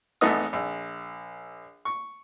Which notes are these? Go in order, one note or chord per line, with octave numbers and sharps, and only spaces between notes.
G#1 E2 A3 B3 D#4 D#6
A#1
C#6